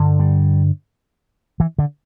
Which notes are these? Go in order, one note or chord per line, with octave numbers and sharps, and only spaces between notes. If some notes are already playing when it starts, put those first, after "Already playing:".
Already playing: G2 D3
G3
E3
D3